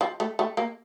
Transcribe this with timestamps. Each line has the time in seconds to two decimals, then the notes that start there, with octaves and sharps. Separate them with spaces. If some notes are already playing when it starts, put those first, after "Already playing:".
0.01 F3
0.20 A3
0.39 A3
0.57 A#3